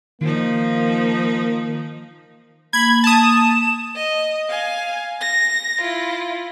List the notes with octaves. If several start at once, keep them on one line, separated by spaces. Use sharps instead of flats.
D#3 F3 A#3 D#4
A#3 B5 G#6
A5 D#6 E7
D#5
F5 G#5
A#6
E4 F4